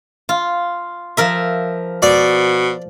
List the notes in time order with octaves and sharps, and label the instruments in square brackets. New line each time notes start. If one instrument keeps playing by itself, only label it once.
[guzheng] F4
F3 A#4 E5
[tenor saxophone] B2 [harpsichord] D5